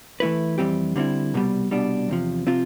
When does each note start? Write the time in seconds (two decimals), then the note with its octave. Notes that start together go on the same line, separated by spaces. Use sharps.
0.20 E3 A3 E4 B4
0.58 F2 E3 G3 C4 G4
0.96 D3 G3 C4 E4
1.34 C2 B2 G3
1.71 C2 B2 G3 D4
2.09 E2 C3 F3
2.47 C3 F3 C4 F4